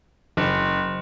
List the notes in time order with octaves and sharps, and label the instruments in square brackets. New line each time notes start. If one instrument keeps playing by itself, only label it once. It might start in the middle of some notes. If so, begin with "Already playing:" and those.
[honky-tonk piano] F#1